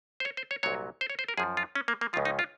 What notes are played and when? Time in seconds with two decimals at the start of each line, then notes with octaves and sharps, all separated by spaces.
0.20 C5
0.25 C#5
0.37 C5
0.51 C#5
0.63 C2 A#2 F#3 C#5
1.01 C5
1.10 C#5
1.19 C5
1.28 A#4
1.37 F#2 F3 G#4
1.57 F4
1.75 C#4
1.88 A#3
2.01 A#3
2.13 C#2 C#3 F3 F4
2.25 D#4
2.39 F4